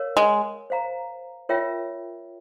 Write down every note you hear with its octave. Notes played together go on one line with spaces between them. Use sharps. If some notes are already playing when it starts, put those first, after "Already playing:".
Already playing: A#4 C#5 F5
G#3
C5 F5 A#5
F4 A#4 C#5 E5 G5